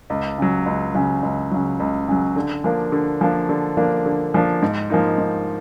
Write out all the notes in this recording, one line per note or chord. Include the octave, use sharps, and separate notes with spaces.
C#2
C#3 F#3
C#2
C#3 F#3
C#2
C#3 F#3
C#2
C#3 F#3
D3
F3 A#3 D4
D3
F3 A#3 D4
D3
F3 A#3 D4
D3
F3 A#3 D4
G#2
F3 A#3 D#4
G#2